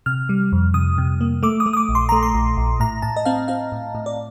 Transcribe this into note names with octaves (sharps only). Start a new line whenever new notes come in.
C3 F6
G3
F2
C3 D#6
C3
A#3
A3 D6
D#6
A3
D#6
D6
A#1
C6
A3 A#5
C6
A#1
A#1
A2 A#5
A2 A5
D#5
C4 F5
C4 F5
A2
A2
D5